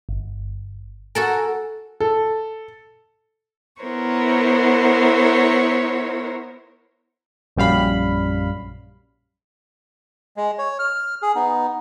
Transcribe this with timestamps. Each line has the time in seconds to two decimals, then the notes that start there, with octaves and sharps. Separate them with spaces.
0.09 G1
1.15 F#4 A4 A#4 G#5
2.00 A4
3.82 B3 E4 A#4 C5 C#5
7.56 A#1 F#2 G3 F5 B5
10.37 G#3
10.58 C#5
10.79 F6
11.22 G#4
11.35 B3 D#4